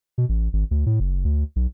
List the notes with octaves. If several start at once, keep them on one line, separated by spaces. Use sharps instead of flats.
B2
A1
G#1
D2
A2
F#1
D2
B1